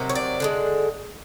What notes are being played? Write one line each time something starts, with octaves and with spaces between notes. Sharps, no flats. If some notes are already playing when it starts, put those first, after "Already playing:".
Already playing: C3 D#3 F#3
C#5
D5
D3 F3 G#3